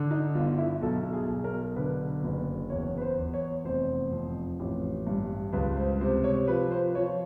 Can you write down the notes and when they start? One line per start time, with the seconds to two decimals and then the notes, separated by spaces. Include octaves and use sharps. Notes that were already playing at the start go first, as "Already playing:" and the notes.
Already playing: D3
0.11 D#4
0.34 G1 F4
0.58 E4
0.81 B1 A4
1.13 G#4
1.28 B1
1.44 A#4
1.76 D3 B4
2.23 F#1
2.70 E2 C#5
2.97 B4
3.02 C5
3.18 E2
3.33 C#5
3.64 F1 C5
4.11 F2
4.59 A1
5.07 G2
5.53 C#2 B4
5.76 C5
6.01 C3 C5
6.24 C#5
6.48 F3 B4
6.71 C5
6.95 F3 C#5